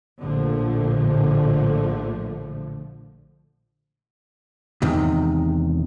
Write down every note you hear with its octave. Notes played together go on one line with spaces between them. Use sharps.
A#1 A2 D3 F3 A3
E2 G#2 C3 D#3